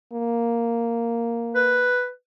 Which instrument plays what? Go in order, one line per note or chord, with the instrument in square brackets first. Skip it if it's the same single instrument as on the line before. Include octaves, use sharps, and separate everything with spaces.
[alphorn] A#3
[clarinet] B4